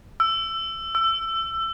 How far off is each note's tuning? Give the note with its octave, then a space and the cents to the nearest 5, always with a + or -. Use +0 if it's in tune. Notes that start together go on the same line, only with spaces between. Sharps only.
E6 +15
E6 +20